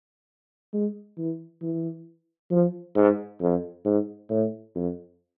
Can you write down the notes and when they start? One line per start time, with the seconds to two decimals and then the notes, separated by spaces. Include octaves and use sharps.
0.74 G#3
1.18 E3
1.62 E3
2.51 F3
2.96 G#2
3.41 F2
3.85 G#2
4.30 A2
4.75 F2